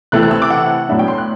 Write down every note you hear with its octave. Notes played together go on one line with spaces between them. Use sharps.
C3 E3 A3 C4 F#6
F#6
E6
D6
F#5
A2 F#3 B3 D4 E5
G5
C6
F#6